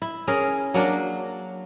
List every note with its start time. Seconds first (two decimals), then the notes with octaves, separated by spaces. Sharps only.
0.02 E4
0.27 C#4 G#4 A#4
0.74 F#3 A#3 D4